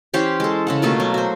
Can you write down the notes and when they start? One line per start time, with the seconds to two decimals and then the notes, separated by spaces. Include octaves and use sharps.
0.14 E3 C#4 G4 C5
0.40 G#3 A4
0.67 C#3 A4 F#5
0.82 B2 A3 A#3 F4
1.00 F#3
1.14 F#4 C5